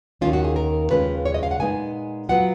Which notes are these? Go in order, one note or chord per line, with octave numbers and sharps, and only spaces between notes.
D#2 D#3 A#3 C#4 F4
F#4
G#4
A#4
D#2 C#3 G#3 C#4 F4 B4
C#5
D#5
F5
F#5
A#2 G#3 B3 D#4 G#5
F#3 B3 F4 F#5